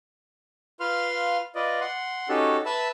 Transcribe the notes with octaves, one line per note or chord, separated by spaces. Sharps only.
F4 B4 F5 C6 F6
F4 B4 D5 D#5
F#5 C6
C#4 D#4 F#4 G4 A4
B4 E5 A5 B5 E6